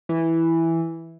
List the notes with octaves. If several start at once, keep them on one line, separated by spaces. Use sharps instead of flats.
E3